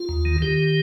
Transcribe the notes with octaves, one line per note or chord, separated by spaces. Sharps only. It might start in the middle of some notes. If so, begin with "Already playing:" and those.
Already playing: F4
D#2
D#3
D#3 G4